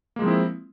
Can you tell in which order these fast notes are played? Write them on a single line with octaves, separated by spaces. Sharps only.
A#3 G#3 F3 C4 E4